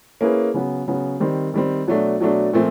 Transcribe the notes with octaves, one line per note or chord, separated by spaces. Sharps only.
A#3 C#4 E4 G#4 B4
C#3 F#3 B3
C#3 F#3 B3
D#3 G3 C4
D#3 G3 C4
B2 F#3 A3 D4
B2 F#3 A3 D4
A#2 F3 A3 C4